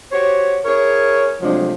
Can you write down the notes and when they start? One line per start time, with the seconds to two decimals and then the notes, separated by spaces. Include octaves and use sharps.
0.12 F#4 G4 C5 C#5
0.65 E4 G#4 A#4 C#5
1.41 C3 F3 F#3 G#3 A3 D4